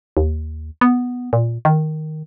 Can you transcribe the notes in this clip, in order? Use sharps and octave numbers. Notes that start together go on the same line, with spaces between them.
D#2
B3
A#2
D#3